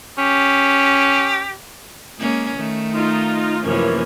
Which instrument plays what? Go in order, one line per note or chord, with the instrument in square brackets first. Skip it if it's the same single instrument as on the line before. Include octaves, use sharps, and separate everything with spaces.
[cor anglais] C#4 [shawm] G4
[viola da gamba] G#3 A#3 C#4
D#3 A3
[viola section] D#4 F4
[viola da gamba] F#2 C3 F3 [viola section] E3 A#3 C#4